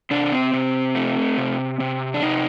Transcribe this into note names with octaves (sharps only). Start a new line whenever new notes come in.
C3 D4
C4
C3
A3
C3
C3
D4
C3 D#4